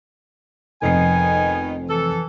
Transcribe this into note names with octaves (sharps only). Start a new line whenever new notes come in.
F1 F2 D#3 B3 D#4 G#5 C7
E3 A4